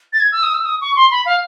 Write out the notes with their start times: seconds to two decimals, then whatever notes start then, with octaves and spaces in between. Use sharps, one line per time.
0.13 A6
0.20 G#6
0.32 E6
0.43 D#6
0.54 E6
0.65 D#6
0.81 C#6
0.96 C6
1.11 B5
1.26 F5